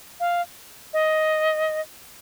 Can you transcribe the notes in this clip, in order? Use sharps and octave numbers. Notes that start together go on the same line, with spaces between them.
F5
D#5